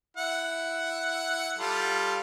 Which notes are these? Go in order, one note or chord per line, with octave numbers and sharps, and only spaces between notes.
E4 F#5
G3 F4 A4